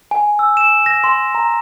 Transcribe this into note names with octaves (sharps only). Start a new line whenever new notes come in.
G#5
E6
E7
A#6
C6
A#5